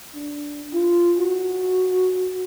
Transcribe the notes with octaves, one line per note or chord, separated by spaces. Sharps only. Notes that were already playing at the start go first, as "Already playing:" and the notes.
D4
F4
F#4